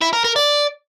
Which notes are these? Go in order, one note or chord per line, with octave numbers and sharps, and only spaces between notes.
E4
A#4
A#4
D5